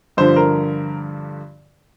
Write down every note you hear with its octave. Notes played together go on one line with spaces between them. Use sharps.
G2 D3 F3 C5
A#4